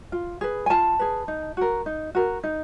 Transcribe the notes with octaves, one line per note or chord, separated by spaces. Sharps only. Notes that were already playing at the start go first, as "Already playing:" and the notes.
F4
G#4 B4
G#5
F4 A5
G#4 B4
D#4
F#4 A#4
D#4
F#4 A#4
D#4